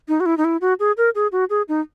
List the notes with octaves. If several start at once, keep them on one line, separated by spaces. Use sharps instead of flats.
D#4
F#4
E4
D#4
E4
F#4
G#4
A#4
G#4
F#4
G#4
D#4